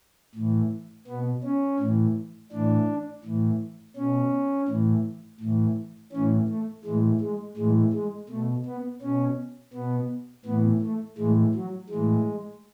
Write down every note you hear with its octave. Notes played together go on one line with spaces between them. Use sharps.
A2 E3
B2 B3
C#4
A2 E3
A2 E3 D4
A2 E3
B2 C#4
A2 E3
A2 E3
A2 E3 C#4
A3
A2 E3 G#3
G#3
A2 E3 G#3
G#3
B2 A3
B3
B2 C#4
B2 B3
A2 E3 B3
A3
A2 E3 G#3
F#3
E3 G#3
A2